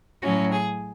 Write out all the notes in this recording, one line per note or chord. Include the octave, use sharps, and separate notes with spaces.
A2 F#3 C#4 F#4
G#4